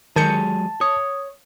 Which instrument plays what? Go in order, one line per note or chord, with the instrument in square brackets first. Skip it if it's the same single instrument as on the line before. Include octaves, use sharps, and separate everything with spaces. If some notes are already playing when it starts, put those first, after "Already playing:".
[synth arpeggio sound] D#3 G6 C#7 [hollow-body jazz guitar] F#3 G#3 G#4 [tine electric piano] A5
[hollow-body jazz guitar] C#5 [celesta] D#6